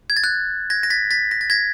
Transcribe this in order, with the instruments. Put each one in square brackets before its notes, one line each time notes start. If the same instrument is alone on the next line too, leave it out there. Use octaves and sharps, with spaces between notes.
[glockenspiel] G#6
A6
F#6 G#6
G#6 A#6
A#6
A6 B6
A6 B6
A#6
A6
G#6 A#6